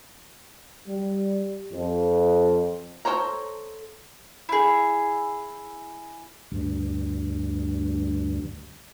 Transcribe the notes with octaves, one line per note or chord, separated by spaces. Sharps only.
G3
F2
A4 A#4 C5 C#5 A#5
E4 G#4
D2 G2